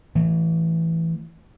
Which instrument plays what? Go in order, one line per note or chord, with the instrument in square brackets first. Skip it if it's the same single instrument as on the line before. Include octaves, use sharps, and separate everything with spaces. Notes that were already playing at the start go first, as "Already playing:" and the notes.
[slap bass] E3 A3